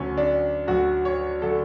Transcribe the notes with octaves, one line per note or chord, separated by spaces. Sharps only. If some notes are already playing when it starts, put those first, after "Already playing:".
Already playing: D2 D3 F#3 C#4
D4
D2 D3 F#3 F#4
C#5
D3 F#3 A4